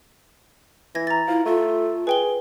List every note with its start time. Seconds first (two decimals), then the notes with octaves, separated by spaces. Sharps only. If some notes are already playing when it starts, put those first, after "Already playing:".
0.95 E3 G#6 A#6
1.07 A#5 A6
1.28 E4 F4
1.46 A3 F4
2.07 G#4 B4 G5 G7